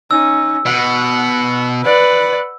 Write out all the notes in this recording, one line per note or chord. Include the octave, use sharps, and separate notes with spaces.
C#4 D#4 E6
B2 F#5
B4 D5 F#5